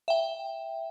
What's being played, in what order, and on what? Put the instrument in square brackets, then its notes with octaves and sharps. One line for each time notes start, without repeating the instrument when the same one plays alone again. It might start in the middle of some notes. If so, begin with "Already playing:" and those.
[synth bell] E5 G5